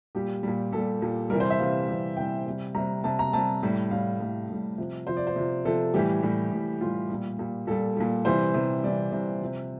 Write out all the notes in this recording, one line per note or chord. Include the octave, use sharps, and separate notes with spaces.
A#2 G3 G4
A#2 G3
A#2 G3 A4
A#2 G3
C3 E3 G3 A#4
C5
E5
C3 E3 G3 F5
C3 E3 G3
C3 E3 G3 G5
C3 G3
C3 G3 A#5
C3 G3 A5
A#5
C3 G3 A5
A2 G3
A2 G3 F5
A2 G3
A2 G3
C3 F3
C3 F3 C5
D5
C5
C3 F3
C3 F3 A4
A2 E3 G3 G4
A2 E3 G3
A2 E3 G3
A2 E3 G3 F4
A#2 G3
A#2 G3
A#2 G3 A4
A#2 G3
C3 E3 G3 C5
C3 E3 G3
C3 E3 G3 D5
C3 E3 G3
C3 F3